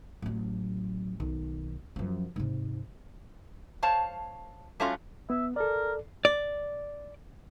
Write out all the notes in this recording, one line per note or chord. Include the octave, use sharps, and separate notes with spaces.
A1 F#3
B1 D#3
F#2 F3
G#2 C3
C5 C#5 F5 A5
G3 A3 C#4 F4 F#4
B3 E5
A4 A#4 D5
D5